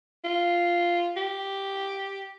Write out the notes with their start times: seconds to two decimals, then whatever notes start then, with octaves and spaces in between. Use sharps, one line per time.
0.24 F4
1.17 G4